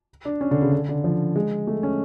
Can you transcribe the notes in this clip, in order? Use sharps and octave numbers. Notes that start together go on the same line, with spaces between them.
D4
C#4
D3
C#3
D3
D3
F3
G#3
A3
C#4